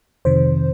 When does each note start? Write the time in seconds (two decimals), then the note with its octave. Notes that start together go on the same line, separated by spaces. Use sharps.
0.25 F2 C3 D#3 C5